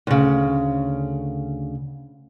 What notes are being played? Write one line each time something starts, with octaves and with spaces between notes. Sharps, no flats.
D2 C#3